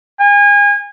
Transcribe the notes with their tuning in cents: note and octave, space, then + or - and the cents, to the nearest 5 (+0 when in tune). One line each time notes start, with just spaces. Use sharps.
G#5 -30